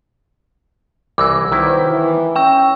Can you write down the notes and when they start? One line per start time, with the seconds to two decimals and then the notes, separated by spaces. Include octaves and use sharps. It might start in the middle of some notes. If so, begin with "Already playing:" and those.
1.18 C2 E3 D6 E6
1.52 D#3 F#3 B3 E4 C5
1.88 E3
2.36 C#4 G5 A#5 C#6 E6